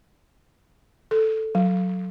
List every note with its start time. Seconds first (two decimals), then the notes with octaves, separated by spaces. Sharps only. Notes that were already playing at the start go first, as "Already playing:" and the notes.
1.11 A4
1.55 F#3